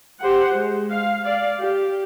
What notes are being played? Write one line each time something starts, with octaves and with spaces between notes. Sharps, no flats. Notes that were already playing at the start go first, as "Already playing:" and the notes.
G4 C5 F#5
G#3
F5
D5 F5
G4